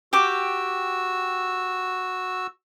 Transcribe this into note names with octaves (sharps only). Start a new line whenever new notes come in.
F#4 G4 G5 D6 E6